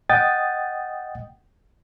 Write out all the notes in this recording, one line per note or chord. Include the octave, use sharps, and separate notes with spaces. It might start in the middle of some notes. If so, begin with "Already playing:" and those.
D#5 F#5 G5 D#6 A6